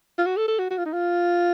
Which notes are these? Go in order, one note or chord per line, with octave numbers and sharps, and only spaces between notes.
F4
F#4
A4
A4
F#4
F#4
F4
D#4
F4